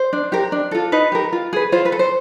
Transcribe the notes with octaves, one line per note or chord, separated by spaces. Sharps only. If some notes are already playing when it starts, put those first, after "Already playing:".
Already playing: C5
D4
G4 A#4
D4
F4 A4
D#4 B4
G4 A#4
F4
G#4 B4
F4 C5
B4
A4
C5